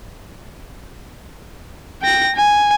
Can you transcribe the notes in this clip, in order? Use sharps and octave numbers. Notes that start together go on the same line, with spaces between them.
G5 A#6
G#5